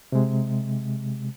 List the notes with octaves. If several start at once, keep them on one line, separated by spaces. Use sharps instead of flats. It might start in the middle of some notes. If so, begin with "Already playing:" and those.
C3 G#3